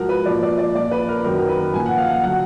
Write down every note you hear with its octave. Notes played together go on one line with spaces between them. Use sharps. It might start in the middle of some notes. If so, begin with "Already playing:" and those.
Already playing: G#2 F3 F#4 A#4
B4
A#2 F3 D5
D5
D5
A#2 F3 D5
B4
A#4
F#2 D#3 F#3 A#4
A#4
B4
A#2 F3 G#5
F#5
F5
F#5
D3 F#3 F#5